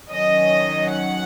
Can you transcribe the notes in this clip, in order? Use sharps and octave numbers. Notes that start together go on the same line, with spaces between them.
D#3 F#3 C#4 D#5
F#5